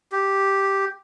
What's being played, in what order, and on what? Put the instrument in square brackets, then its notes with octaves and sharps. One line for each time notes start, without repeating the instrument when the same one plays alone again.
[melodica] G4